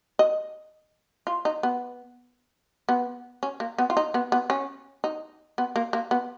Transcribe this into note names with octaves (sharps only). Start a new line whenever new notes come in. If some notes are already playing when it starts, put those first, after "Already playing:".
D#5
F4
D#4
B3
B3
C#4
A#3
B3
F4
D#4
B3
B3
C#4
D#4
B3
A#3
A#3
B3